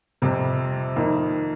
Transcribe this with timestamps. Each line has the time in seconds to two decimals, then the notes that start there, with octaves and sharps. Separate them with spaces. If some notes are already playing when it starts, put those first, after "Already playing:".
0.22 F2 C3 G3
0.96 F2 D#3 A#3